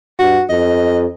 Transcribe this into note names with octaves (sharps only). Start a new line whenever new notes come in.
G2 F#4
F2 D#5